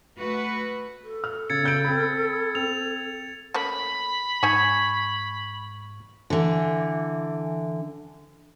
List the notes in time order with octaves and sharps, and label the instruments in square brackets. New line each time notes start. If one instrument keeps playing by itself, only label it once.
[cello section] A3 F#4 B4
[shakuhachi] A4
[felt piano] F6
[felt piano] C#3 [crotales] G#6 A6 C#7
[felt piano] C#3 G6 D7
C4 B5
[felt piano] C4 [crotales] F7
[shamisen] A3 A#3 C#4 [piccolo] B5
[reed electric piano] G#2 C#6 G#6 [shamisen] D#4 G#5
[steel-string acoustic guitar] D3 E3